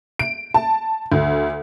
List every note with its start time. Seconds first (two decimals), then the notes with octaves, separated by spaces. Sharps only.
0.19 D7
0.54 A5
1.12 D2